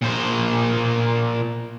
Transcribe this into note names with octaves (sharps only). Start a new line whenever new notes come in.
A#2 C5